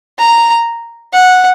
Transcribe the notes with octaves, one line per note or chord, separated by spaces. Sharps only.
A#5
F#5